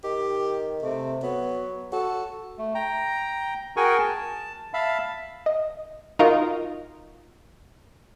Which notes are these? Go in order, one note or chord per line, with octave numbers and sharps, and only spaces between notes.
D#3 G4
C3 A3
F#3 B3
F#4 A4
A3
G5 A#5
F#4 G#4 A#4 G5 G#5 C#6
A5
E5 F5 A5 B5
D#5
D#4 F4 F#4 A#4 D#5